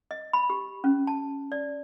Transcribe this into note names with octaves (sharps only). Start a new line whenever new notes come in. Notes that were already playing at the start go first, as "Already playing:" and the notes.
D#5
B5
G4
C#4
A5
D5